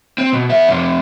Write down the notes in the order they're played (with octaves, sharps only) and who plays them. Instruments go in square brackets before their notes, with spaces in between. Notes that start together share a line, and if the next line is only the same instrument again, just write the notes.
[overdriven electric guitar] C4
B2
B3 E5
F2 C3